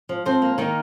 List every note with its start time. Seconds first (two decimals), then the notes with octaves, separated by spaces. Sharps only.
0.09 F3
0.26 F3 C4 C5
0.42 A#3
0.58 D#3 A#3 D#4